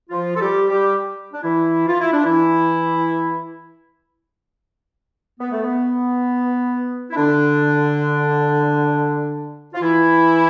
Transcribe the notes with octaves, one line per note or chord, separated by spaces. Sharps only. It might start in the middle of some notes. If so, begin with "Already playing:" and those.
F3 F4
A4
G3 G4
G3 G4
D4
E3 E4
F4
E4
D4
E3 E4
B3
A3
B3
E4
D3 D4
F4
E3 E4